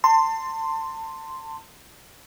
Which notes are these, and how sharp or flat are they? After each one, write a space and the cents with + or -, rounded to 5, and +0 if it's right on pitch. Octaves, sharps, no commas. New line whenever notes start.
A5 +30 C6 +0